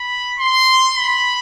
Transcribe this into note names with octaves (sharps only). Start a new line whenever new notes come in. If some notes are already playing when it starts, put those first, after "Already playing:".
Already playing: B5
C6
B5